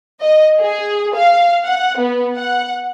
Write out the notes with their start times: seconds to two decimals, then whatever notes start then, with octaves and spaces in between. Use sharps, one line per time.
0.21 D#5
0.60 G#4
1.15 F5
1.65 F#5
1.99 B3
2.35 F#5